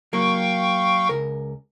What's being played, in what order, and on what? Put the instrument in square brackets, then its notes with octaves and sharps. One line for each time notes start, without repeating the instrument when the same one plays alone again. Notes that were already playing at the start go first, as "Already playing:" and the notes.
[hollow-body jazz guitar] F#3 A#3 [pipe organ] F5 G5 C#6
[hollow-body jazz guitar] C#2 A#4